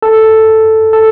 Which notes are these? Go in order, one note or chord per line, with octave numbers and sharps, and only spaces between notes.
A4
A4